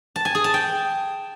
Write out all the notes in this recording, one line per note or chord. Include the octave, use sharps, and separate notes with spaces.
A5
G#5
G#4
A5
G5